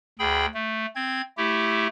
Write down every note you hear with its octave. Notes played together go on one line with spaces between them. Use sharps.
D2 G#4 G5 B5
A3
C4 G#6
A3 E4 G4